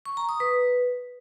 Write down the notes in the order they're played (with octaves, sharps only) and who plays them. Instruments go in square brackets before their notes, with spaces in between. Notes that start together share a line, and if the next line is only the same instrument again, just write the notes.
[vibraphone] C#6
A#5
D#6
B4